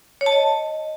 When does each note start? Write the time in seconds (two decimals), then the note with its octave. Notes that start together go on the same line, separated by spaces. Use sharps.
0.21 C#5
0.26 A5
0.32 D#5